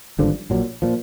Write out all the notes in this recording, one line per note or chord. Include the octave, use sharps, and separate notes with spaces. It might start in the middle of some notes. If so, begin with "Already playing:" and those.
G#1 G2 D3 F3
A#1 A#2 F#3
A#2 F3